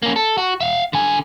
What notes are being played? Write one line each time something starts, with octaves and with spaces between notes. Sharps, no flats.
A#3 C#4
A4
F#4
E5 F5
D3 G#5